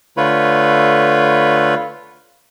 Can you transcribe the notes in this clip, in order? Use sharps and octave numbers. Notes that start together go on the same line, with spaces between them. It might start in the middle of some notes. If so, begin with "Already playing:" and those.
D3 A3 F4 B4 C#5 B5